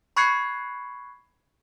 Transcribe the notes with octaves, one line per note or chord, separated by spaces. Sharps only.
B5 C#6 F#6 G#6 C7 C#7